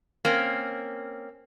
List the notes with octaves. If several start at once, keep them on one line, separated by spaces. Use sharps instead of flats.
A#3 C4 C#4